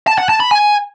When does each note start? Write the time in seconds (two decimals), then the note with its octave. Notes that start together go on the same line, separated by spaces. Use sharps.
0.07 A5
0.18 F#5
0.29 A5
0.40 B5
0.51 G#5